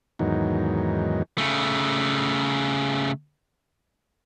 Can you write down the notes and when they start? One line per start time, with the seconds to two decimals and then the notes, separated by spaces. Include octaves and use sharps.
0.19 E2 G#2 D#3 F#3
1.38 C#3 A3